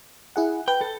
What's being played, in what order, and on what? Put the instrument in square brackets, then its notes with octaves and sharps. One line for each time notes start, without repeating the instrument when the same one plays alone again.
[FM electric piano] E4 G#4 F#5
[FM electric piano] B4 [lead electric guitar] G5
[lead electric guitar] A4